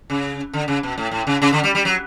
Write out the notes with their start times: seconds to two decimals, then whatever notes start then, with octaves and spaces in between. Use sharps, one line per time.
0.10 C#3
0.53 D3
0.68 C#3
0.83 B2
0.98 A2
1.12 A2
1.27 C#3
1.42 C#3
1.52 D3
1.64 G3
1.75 G3
1.85 F#3